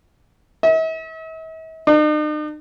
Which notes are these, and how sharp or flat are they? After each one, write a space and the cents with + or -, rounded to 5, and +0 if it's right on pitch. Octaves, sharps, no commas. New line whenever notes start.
E5 -45
D#4 -45